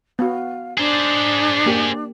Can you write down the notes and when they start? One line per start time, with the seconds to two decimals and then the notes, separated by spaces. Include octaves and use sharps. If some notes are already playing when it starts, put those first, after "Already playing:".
0.19 B3 F#4 F5
0.77 D4 G#4 C5
1.66 A#3 G4